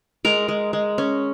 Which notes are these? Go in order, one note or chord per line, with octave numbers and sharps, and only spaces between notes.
G#3 A#4
G#3
G#3
C#4